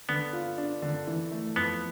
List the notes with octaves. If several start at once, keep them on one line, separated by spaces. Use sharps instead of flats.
D3 B3
F4
D4
D3
E3
A3
F2 B3